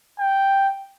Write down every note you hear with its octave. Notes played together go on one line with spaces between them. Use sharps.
G5